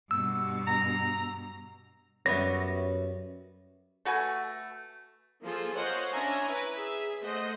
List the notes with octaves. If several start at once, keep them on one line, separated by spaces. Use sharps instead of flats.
G2 B2 E6
A#5
F#2 G3 B3 C#5 E5 A#6
A3 F#4 B4 G#5
F3 A#3 F4 G#4 A4
A#4 C5 C#5 D#5 F5 F#5
C#4 D4 E5 G#5 A#5
E4 B4
G#4 E5
A3 C5 D#5 F#5